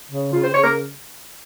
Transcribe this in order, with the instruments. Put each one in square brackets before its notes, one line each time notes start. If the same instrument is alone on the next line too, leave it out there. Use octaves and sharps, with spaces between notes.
[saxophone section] C#3
C#3 F4
C5
C#3 C#5
A#4